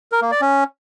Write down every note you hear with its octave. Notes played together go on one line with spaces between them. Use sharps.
A#4
A#3
D5
C#4